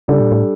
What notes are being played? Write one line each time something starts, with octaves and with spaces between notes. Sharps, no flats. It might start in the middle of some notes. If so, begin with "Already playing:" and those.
C#3 G3 D4 A4 D5
A#2
A2